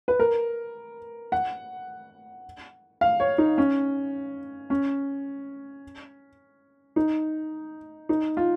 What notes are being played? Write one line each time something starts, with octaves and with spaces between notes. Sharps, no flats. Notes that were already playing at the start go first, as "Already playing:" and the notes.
B4
A#4
F#5
F5
C#5
D#4
C#4
C#4
D#4
D#4
F4